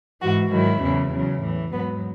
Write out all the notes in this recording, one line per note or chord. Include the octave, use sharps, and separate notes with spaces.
G#2 E3 F#4
G#2 D#3 F#3 E4
E2 C#3 E3
E2 C#3 F#3
A2 E3
G#2 F#3 B3